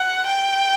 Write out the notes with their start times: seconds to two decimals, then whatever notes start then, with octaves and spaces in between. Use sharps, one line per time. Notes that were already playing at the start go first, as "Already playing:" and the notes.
Already playing: F#5
0.27 G5